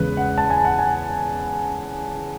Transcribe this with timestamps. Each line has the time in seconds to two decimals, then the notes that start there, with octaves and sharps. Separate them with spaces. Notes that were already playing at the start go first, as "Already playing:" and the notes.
Already playing: E2 C#3 G#3 B4
0.17 F#5
0.38 A5
0.50 G#5
0.65 F#5
0.79 G#5